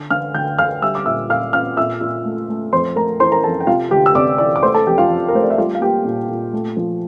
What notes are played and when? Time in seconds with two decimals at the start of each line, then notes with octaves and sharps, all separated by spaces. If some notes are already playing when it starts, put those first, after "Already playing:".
Already playing: D3
0.10 D3 F5 F6
0.35 D2 G5 G6
0.58 D2 F5 F6
0.82 G3 E5 E6
0.95 D6
1.06 A#2 E5 E6
1.29 A#2 F5 F6
1.53 A#2 F5 F6
1.77 A#2 E5 E6
2.01 A#2
2.25 A3
2.49 A3
2.73 F2 C5 C6
2.96 A3 A#4 A#5
3.20 E3 C5 C6
3.32 A#4 A#5
3.44 F2 A4 A5
3.60 G5
3.67 C3 F4 F5
3.91 D2 G4 G5
4.06 E6
4.15 C3 D5 D6
4.38 E3 D5 D6
4.56 D6
4.63 A3 C5 C6
4.74 A4 A5
4.87 F2 G4 G5
4.98 F4 F5
5.10 F2
5.28 A#4
5.34 A3 C5
5.43 D5
5.50 E5
5.58 G3 F4 F5
5.75 F5
5.81 A#3 G4 G5
6.05 A#2
6.29 A#2
6.53 A3
6.77 F3